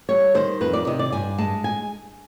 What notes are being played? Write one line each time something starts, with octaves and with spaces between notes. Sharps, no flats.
G3 C#5
D#3 C5
F2 B4
D5
C3 D#5
D5
G2 G#5
G#3 A5
G#5